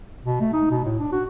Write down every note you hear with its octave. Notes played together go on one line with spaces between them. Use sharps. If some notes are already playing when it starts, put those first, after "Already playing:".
B2
A3
D#4
B2
A2
D4
F#4